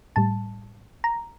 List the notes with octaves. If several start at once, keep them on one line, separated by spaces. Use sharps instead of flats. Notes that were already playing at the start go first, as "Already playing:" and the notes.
A2 G3 A5
A#5